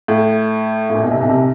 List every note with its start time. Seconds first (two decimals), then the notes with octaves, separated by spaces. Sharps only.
0.08 A2
0.90 A2
0.94 A#1 A#2
1.03 B1 B2
1.11 C2 C3
1.21 B1 B2
1.29 C2 C3